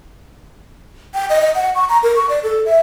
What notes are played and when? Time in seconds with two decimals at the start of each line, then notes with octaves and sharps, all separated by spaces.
1.14 G5
1.29 D#5
1.41 D#5
1.55 F#5
1.75 C#6
1.89 A#5
2.03 A#4
2.16 C#6
2.29 D5
2.43 A4
2.65 E5